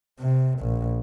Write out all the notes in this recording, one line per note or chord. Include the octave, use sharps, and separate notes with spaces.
C3
A#1